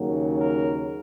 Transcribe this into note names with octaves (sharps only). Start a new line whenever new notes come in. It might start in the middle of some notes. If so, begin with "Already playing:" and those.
Already playing: D#2 C#3 F#3 A#3
A#4